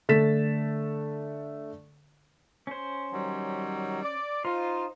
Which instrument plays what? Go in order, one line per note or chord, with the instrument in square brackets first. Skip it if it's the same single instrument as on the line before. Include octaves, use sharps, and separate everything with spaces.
[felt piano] D3 A3 A6 B6 E7
[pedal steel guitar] C#4 C5
[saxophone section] D#3 F#3 G3
D5
[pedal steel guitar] D#4 C5 F5 [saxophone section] F4